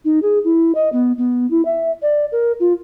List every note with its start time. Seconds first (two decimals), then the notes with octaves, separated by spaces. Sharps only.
0.05 D#4
0.22 G#4
0.44 E4
0.75 D#5
0.92 B3
1.18 B3
1.50 E4
1.65 E5
2.02 D5
2.32 A#4
2.60 F4